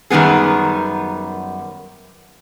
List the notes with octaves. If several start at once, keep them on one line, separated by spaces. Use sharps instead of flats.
F#2 D#3 G3 B3 G#4